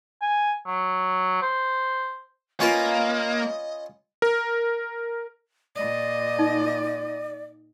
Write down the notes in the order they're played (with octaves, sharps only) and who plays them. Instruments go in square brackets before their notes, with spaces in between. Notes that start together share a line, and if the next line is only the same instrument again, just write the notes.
[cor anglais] G#5
F#3
C5
[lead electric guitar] A#3 [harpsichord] C#4 F4 B4 [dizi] D#5
[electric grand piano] A#4
[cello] A#2 D#5 [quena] D5
[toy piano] D#4